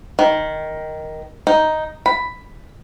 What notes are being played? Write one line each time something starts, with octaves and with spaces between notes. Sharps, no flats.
D#3
D#4
B5